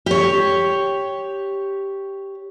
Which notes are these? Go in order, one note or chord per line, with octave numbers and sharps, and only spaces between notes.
G4 C#5